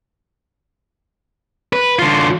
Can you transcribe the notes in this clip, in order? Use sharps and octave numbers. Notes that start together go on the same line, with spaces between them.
B4
D3 F4